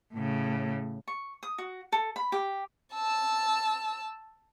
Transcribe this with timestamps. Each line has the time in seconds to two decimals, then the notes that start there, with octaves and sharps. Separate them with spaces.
0.14 A2 C#3
1.08 C#6
1.43 D#6
1.58 F#4
1.92 A4
2.16 B5
2.32 G4
2.94 A5 E6